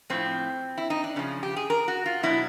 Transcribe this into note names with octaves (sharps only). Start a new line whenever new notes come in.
A2 F3 C4
E4
D#4
D4
C#3 F3 C#4
G4
G#4
A#4
F#4
F4
B2 F#3 E4